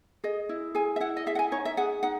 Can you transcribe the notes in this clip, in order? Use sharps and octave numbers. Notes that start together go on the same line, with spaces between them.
G#4 D#5
E4
G#4 G#5
E5
E4 F#5
D#5
G#4 E5
F#5
G#5
D#4 C#5
E5
G#4 F#5
D#4 F#5